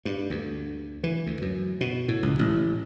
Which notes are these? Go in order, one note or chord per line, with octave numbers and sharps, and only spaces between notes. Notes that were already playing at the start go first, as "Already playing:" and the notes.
G2
D2
E3
D2
F#2
B2
A2
C#2
A1